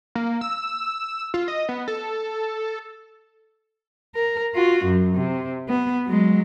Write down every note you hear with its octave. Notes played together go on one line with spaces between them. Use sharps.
A#3
E6
F4
D#5
B3
A4
A#4
F4 F#4
F#2
C3
B3
F#3 G#3